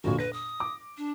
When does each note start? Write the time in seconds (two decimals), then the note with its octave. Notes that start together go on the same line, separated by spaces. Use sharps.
0.04 G1 F2 A#2 F#4
0.19 B4 A#6
0.33 D#6
0.60 D6
0.98 D4